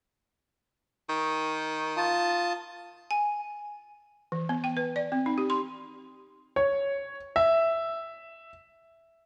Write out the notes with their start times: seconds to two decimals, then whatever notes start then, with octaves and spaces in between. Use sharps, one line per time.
1.09 D#3
1.97 F4 A5 D#6
3.11 G#5
4.32 E3
4.49 B3
4.64 G5
4.77 B4
4.96 D5
5.12 C4
5.26 D#4
5.38 G4
5.50 C6
6.56 C#5
7.36 E5